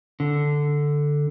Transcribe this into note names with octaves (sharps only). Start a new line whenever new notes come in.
D3